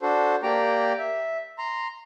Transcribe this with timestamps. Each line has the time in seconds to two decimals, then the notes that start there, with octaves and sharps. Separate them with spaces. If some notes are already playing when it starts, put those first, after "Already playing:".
0.02 D4 F#4 A4 C5
0.43 A#3 G4 D5 G5 A#5
0.99 E5
1.58 A#5 C6